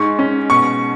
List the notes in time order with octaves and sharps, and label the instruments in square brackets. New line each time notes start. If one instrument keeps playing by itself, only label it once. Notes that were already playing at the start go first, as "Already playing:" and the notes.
Already playing: [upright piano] G#2 D#4 C#6
C#4
B2 C#6